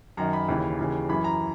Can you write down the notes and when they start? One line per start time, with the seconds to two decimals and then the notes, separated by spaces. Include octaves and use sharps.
0.17 F#2 D#3 A#5
0.33 B5
0.48 D#2 C#3 E3
0.79 D#2 C#3 E3
1.09 F#2 E3 B5
1.24 A#5